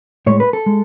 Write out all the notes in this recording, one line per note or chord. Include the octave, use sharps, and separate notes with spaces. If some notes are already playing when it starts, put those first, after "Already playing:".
A2 G#3 C#5
B4
A4
G#3